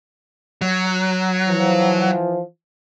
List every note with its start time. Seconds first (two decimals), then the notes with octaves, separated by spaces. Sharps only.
0.61 F#3
1.46 E3 F3